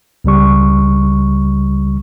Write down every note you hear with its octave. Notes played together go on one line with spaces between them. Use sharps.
C#2 C#3 G3 C#6